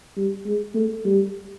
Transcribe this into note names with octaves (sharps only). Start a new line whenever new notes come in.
G3
G#3
A3
G3